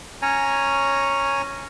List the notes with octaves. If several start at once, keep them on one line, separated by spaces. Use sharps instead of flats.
C#4 C#5 G#5 A#5